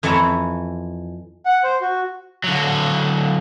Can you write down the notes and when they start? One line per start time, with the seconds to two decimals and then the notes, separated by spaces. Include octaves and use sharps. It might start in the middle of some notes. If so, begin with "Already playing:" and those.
0.03 F2 E3 B4 C#5 E5 A#5
1.46 F#5
1.63 C5
1.81 F#4
2.44 D3 F#3